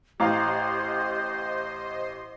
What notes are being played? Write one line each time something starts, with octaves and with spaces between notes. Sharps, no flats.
A1 G4 C5 D#5 F5 A#5 C6